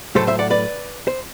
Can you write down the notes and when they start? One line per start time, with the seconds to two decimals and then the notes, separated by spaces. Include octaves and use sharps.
0.16 A2 F#3 A3 A4 C5
0.27 C5 E5
0.39 D5 F#5
0.50 B4 D5
1.07 C5